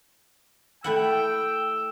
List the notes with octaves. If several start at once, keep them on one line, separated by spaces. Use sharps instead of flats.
A3 E4 F#5 G5 E6